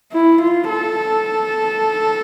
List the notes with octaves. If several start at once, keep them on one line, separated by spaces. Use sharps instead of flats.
E4
F4
A4